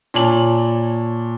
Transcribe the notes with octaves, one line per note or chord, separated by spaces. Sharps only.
A#2 C#5 A5 F#7